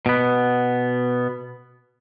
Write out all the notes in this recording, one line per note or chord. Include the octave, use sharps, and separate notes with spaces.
B2 B3